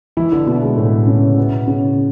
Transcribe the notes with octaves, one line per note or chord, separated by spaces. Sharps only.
E3 E4
D3 D4
B2 B3
G#3
A2 A3
C#3 C#4
B2 B3
C#3 C#4